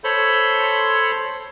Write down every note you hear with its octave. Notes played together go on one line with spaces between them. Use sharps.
A4 C5 C#5 B5 C6